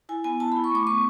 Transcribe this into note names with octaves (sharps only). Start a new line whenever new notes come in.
E4 G#5
B3 G#5
E4 A5
E4 B5
C#6
A3 D6
B3 C#6